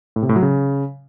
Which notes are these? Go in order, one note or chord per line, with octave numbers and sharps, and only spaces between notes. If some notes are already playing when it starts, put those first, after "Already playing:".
A2
C3
A2
F#3
C#3